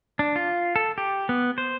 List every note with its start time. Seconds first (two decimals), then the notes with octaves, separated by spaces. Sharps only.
0.19 D4
0.36 F4
0.76 A4
0.98 G4
1.29 B3
1.58 C5